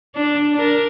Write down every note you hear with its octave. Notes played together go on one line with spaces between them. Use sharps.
D4
D4 A#4